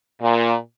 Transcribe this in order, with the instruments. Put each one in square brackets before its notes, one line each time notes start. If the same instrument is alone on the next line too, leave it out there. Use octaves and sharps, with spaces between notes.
[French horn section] A#2